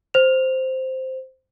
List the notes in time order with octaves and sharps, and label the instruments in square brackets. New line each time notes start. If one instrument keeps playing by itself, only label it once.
[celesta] C5 F7